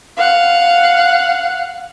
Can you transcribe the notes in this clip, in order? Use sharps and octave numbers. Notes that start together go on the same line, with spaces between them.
F5 F#5